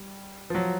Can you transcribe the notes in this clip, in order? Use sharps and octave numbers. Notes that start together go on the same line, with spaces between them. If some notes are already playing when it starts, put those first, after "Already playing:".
Already playing: G3
F3
F#3